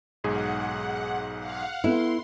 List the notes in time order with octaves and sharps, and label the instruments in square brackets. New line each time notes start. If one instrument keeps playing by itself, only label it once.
[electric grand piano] B1 G#2 G#4 [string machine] F#5
[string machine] F5 F#5
[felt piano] B3 A4 [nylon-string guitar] E4 [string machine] C6